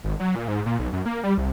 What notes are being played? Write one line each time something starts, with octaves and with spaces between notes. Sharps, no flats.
G#1
F#3
A#2
G#2
A#2
B1
F#2
A#3
G3
C2